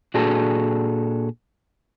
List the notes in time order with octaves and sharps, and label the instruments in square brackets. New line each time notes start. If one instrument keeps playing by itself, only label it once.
[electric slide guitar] A#2 D4 F#4 G#4 A4